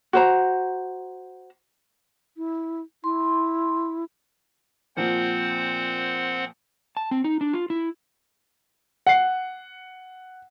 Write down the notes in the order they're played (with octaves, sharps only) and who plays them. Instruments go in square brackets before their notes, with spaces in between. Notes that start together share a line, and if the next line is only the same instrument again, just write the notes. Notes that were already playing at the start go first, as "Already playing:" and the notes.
[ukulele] F#4 C5 A#5
[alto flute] E4
[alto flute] E4 [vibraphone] C6
[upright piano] A#2 F3 [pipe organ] C4 C5 F#5
[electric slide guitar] A5
C4
D#4
D4
F4
E4
[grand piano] F#5 C7